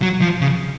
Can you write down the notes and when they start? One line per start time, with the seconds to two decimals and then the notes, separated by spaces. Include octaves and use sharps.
0.02 F#3
0.21 F3
0.41 C#3